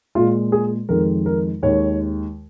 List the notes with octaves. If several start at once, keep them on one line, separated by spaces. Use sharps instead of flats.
A#2 G#3 F4
G#4
F2 D#3 G#3 A#4
A#4
D#2 D#3 G#3 C#5